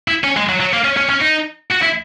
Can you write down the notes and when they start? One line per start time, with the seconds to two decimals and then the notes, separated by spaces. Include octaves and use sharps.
0.08 E4
0.24 C#4
0.37 G#3
0.49 F#3
0.60 F#3
0.73 A#3
0.85 C#4
0.97 C#4
1.10 C#4
1.21 D#4
1.70 F#4
1.82 E4